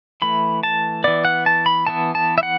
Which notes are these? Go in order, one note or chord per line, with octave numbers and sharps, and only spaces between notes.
E3 A3 B5
A5
E3 B3 D5
F#5
A5
B5
E3 B3 A5
A5
E5
F#5